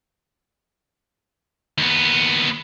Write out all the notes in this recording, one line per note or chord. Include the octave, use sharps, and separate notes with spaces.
D#2 B3